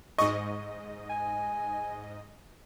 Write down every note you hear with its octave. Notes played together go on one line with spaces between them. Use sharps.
G#2 D#5 C#6
G#5